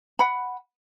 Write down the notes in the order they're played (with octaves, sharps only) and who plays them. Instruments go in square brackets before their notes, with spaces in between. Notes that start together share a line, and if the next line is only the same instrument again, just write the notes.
[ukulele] F#5 B5